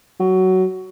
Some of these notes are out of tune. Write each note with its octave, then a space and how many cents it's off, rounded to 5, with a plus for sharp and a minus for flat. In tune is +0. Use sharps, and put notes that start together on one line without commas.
F#3 +15